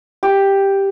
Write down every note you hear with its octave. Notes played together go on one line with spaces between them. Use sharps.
G4